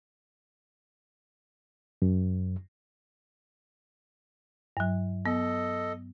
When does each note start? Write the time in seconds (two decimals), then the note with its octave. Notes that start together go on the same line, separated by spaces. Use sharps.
2.02 F#2
4.77 G2 F#3
5.26 B3 A4 D#5